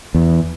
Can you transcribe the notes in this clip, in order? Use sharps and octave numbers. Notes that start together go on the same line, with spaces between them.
E2